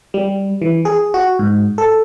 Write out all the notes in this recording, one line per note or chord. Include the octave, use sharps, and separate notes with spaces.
G3
E3
G#4
F#4
G#2
A4